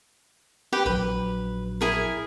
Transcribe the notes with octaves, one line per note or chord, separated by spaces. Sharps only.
G4 B4 G5
A#1 F#3 B4
E4 G#4 A#4